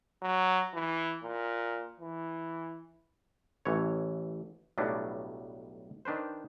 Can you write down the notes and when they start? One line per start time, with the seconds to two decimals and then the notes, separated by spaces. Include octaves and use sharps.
0.22 F#3
0.74 E3
1.23 A#2
2.00 E3
3.65 A1 E3 C#5
4.78 B1 A2 F#3 G3 B3 D4
6.05 D#3 D4 B4 C5